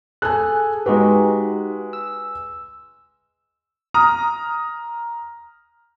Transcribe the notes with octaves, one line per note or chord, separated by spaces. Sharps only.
G#4 A4 G#5 F#6
G#3 D#4 F#4 G4 B4
E6
A#5 D#6 F6